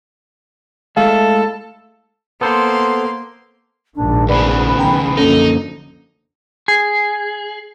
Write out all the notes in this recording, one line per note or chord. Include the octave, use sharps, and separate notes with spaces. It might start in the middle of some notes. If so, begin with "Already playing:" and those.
G#3 A3 E4 A4 F5
A#3 B3 A4 C5 C6
A#1 G#2 D#3 D4
D2 C#3 B3 B4 D5
B1 D#3 G5 A#5 B5
F#2 D3 F3 A#3 C#4 D#4 A4
G#4